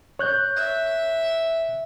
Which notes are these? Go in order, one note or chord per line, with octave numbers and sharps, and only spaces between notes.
C#5 F#6 G6
E5